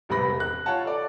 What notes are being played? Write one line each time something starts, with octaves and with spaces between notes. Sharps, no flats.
E1 C2 C3 B4 B5 A#6
F#6
F4 C#5 F5 F#5 A5
A4 D5